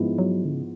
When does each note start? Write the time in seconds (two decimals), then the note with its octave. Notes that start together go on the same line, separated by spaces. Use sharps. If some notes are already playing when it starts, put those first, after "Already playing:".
Already playing: G#2 F3 G#3 B3 E4
0.19 F#3
0.45 D3
0.54 C#3